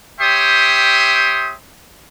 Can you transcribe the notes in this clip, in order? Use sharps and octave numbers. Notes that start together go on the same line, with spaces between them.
G4 C#5 E5 G5 C6 D#6